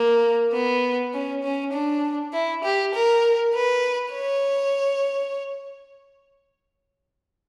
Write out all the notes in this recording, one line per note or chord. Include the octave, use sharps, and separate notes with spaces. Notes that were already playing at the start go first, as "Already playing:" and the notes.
Already playing: A#3
B3
C#4
C#4
D4
E4
G4
A#4
B4
C#5